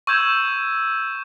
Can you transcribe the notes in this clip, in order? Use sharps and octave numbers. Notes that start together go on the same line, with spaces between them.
C#6 E6 G6 G#6 E7